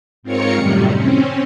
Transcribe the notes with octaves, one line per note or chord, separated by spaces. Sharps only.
G#2 C4 F4 A#4 C#5 C#7
F#2 A2 C3 D#3 G3
C4 C#4